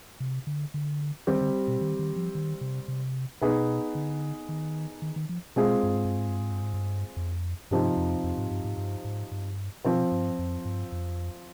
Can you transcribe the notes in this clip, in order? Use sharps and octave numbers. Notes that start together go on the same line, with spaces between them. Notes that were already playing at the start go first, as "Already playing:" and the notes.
C3
D3
D3
D#3 G3 C4 G4
D3
B2
D#3
D#3
F3
D#3
C3
C3
B2 B3 D#4 G#4 B4
D3
D#3
D#3
D#3
F3
B2 G#3 C4 F4 G#4
G2
G#2
G2
G#2
G2
G#2
G2
G#2
G2
F2
G2 C3 F3 C4 D#4
F2
F2
G#2
G2
G#2
G2
G#2
G2
B2 F3 C4 F4 C5
G2
F2
G2
F2